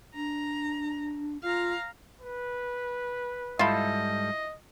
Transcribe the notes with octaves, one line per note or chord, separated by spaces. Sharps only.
D4 A#5
F4 F5 A#5
B4
G#2 G3 E4 F4 A4 D#5